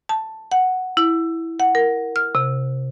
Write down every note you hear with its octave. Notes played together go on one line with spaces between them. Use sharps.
A5
F#5
E4
F#5
A#4
F6
C3